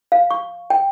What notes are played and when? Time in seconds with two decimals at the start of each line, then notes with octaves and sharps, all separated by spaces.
0.12 F5
0.31 C#6
0.70 G5